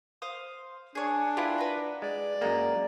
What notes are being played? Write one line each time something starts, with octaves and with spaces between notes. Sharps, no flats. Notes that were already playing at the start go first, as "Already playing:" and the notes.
C5 F5 D#6
D4 G#4 C#5
E4 F4 G4 B4 G#5
B4 F#5 A#5
G#3 D5
F#2 G#3 A#3 G5 A#5